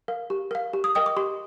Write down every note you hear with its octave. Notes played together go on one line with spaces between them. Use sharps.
A#4 F5
G4
A#4 F5
G4
D#6
A#4 D#5 G5 D#6
D6
G4 C6